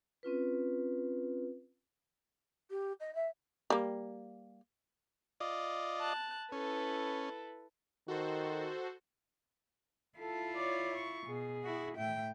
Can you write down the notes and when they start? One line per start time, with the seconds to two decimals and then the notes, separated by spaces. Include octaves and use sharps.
0.23 C4 C#4 F4 B4
2.70 G4
3.00 D#5
3.15 E5
3.70 G3 A#3
5.40 F4 D5 D#5
5.99 A5 F#6
6.52 C#4 E4 A4 B4
8.08 D#3 F#4 A4 C5
10.18 E4 F4 A4
10.55 C#5 D5
10.95 C#6
11.27 B2 G#4
11.63 E4 F#4
11.97 A2 E5 G5